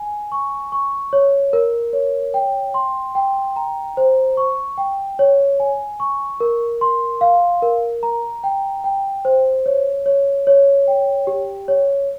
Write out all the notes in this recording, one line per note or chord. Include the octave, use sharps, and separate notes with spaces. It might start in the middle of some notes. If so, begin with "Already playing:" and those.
Already playing: G#5
C#6
C#6
C#5
A#4
C#5
G5
C6
G5
A#5
C5
C#6
G5
C#5
G#5
C#6
A#4
C6
F5
A#4
A#5
G5
G5
C5
C#5
C#5
C#5
G5
G4
C#5